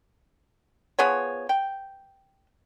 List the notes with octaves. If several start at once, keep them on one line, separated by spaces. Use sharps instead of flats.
F3 B3 G#4 C#5
G5